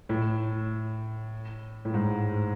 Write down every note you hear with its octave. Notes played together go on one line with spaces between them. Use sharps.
A2
A2
G#2